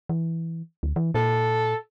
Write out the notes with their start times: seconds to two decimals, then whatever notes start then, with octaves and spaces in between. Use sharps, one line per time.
0.09 E3
0.83 D2
0.96 E3
1.14 A#2 A4